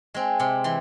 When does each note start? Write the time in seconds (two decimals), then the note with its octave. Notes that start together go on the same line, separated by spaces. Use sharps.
0.14 G#3 C4
0.39 C3 C6
0.64 E3 C6